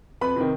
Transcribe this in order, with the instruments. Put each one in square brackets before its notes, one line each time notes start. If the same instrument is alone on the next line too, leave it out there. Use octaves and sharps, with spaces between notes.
[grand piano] F2 B4 B5
C3 D#3